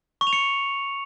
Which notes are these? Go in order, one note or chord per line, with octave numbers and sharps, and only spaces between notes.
C#6
F7
C#7